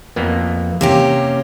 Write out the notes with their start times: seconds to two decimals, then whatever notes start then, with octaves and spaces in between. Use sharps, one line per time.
0.16 F2 A#3 B3
0.81 C3 A#3 C#4 G4